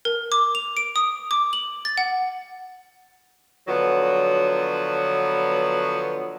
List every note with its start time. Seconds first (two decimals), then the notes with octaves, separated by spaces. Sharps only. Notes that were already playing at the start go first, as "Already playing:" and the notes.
0.05 A#4
0.32 D6
0.55 F7
0.77 D7
0.96 D#6
1.31 D6
1.53 F#7
1.85 A6
1.98 F#5
3.67 D3 F3 F#3 B3